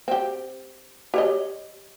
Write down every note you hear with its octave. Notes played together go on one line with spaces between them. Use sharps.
C4 G4
G4 C#5 D#5